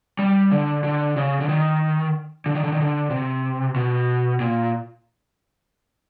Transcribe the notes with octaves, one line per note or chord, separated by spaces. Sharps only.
G3
D3
D3
C#3
D3
D#3
D3
D#3
D3
D#3
D3
C3
B2
A#2